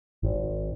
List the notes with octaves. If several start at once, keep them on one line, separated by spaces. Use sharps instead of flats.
G#1